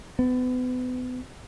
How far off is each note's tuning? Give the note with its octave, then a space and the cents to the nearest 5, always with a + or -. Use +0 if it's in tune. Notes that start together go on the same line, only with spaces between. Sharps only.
B3 +35